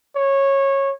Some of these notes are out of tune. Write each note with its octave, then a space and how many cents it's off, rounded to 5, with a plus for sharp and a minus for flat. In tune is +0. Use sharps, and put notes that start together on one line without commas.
C#5 -15